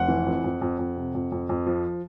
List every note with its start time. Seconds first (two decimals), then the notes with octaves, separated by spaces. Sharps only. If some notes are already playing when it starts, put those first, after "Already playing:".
Already playing: F1 F#5
0.08 E3
0.26 F2
0.44 F2
0.62 F2
0.79 F2
0.96 C3
1.15 F2
1.32 F2
1.49 F2
1.66 F3